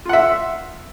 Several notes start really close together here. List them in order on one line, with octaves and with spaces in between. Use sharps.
F4 F#5 E5